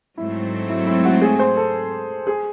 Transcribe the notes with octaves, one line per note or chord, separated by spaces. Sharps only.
G#2 F#3 A3 C4 E4
E4
E4
F#4
G#4
C5
A4
G#4